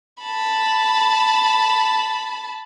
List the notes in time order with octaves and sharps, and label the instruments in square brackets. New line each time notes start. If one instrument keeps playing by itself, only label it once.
[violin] A5 B5